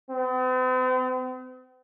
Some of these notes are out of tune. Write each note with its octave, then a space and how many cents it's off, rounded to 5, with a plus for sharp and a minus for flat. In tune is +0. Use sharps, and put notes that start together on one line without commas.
C4 -45